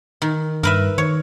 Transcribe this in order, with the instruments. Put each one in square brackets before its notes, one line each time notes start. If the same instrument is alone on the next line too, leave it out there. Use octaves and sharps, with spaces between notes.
[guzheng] D#3
[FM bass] G2 [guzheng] A#4 B4 E5
[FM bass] D#3 [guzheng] C#5